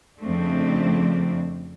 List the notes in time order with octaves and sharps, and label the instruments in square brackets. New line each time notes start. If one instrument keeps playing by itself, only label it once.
[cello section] F2 C#3 F3 A3 C4 D4